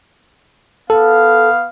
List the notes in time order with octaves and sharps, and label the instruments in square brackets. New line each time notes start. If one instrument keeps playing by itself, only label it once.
[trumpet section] B3 F5 [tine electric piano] A4